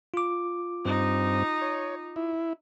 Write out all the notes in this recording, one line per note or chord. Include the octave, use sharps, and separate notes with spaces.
F4 D6
G2 C4 D#4
C#5
E4